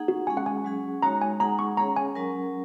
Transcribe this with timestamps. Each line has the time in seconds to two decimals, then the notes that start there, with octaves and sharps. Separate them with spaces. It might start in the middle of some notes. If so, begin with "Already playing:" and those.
Already playing: A#3 D#4 G#4 F#5
0.08 F#4
0.27 G#3 C#4 G#4 G#5
0.37 F#5
0.46 G#5
0.64 F#3 C#4 G#4
1.02 G#3 D#4 F#4 C#5 A#5
1.22 G#5
1.40 G#3 D#4 G#4 F#5 A#5
1.59 C#6
1.77 C#4 G#4 C#5 A#5
1.96 G#5
2.15 F#3 C#4 A#4